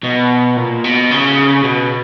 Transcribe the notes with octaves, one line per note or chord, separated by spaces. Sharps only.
B2
A#2
B2
C#3
B2